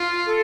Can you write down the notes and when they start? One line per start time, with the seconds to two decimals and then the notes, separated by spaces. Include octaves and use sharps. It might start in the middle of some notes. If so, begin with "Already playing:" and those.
Already playing: F4
0.26 A4